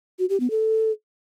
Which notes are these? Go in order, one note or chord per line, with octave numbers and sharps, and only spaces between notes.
F#4
G4
B3
A4